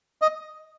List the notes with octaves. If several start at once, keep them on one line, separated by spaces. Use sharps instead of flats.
D#5